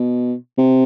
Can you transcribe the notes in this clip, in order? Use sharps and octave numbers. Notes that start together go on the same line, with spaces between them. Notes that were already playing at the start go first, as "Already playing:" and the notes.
Already playing: B2
C3